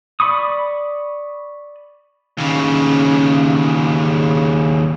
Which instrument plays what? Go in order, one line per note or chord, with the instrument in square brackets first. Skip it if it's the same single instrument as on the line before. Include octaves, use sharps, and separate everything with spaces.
[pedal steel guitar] D5 B5 C#6 D#6
[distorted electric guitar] D#2 C#3